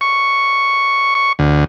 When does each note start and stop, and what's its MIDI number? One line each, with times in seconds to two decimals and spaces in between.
0.01 1.14 85
1.15 1.32 85
1.39 1.64 38